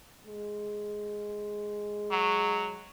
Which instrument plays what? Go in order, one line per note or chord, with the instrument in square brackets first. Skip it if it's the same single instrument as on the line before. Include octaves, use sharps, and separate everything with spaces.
[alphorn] G#3
[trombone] F#3